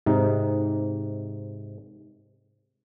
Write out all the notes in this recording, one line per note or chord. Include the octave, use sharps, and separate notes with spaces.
G#2 C3 D#4